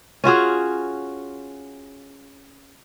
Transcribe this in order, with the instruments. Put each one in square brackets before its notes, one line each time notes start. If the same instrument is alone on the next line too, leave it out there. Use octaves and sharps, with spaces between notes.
[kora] C#4 F4 F#4 G#4